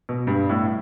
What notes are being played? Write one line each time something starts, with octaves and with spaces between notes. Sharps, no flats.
B2
G2
A2